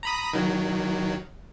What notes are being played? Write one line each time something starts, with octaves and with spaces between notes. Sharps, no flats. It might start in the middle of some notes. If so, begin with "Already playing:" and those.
A#5 B5 D#6
D#3 F#3